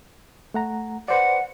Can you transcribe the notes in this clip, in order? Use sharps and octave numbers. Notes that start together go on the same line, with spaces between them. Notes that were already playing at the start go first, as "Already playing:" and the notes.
A3 F#5 A#5
B4 C5 D5 F#5